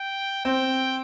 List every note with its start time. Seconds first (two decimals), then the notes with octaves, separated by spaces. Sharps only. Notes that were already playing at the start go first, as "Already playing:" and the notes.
Already playing: G5
0.45 C4 G5